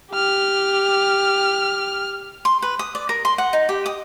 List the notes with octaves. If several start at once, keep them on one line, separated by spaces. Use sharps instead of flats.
G4 F6
C6
B4
D#6
D5
A#4
C6
F#5
D#4
G4
D#6